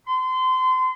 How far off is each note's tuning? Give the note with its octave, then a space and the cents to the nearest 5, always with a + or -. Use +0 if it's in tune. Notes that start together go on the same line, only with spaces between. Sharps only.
C6 -30